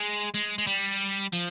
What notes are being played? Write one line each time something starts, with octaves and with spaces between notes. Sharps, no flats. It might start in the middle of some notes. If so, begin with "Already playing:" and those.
Already playing: G#3
G#3
G#3
G3
F3